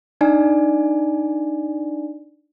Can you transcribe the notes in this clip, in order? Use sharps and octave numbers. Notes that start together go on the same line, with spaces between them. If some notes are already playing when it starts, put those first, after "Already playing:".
D4 D#4 D5 G#5